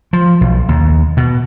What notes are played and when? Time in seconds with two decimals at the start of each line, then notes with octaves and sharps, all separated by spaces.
0.13 F3
0.41 B1
0.68 D#2
1.17 B2